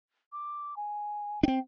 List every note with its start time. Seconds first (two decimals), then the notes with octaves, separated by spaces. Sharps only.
0.33 D6
0.77 G#5
1.43 C4 D4 G5